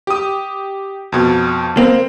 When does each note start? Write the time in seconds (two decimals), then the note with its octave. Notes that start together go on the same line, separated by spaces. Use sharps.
0.07 G4 D#6
1.12 F2 B2
1.77 A#3 C4